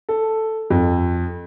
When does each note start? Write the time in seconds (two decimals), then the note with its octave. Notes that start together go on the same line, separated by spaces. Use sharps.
0.09 A4
0.70 F2